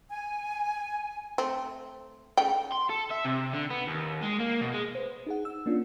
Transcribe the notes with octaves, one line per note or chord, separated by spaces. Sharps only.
G#5
A3 C4
C#3 A3 G5
C6
A4
E5
C3
D3
B3
D#2
G#3
A#3
B2
G#3
B4 C5
D#4 G#4 F#5
E6
A#3 C#4 D4 F4